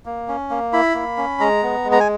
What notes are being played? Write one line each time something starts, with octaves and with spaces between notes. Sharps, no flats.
A#3
C#4
A#3
E4 B5
A#3
C#4
G#3 A#5
B3
G#3
A#5
G#5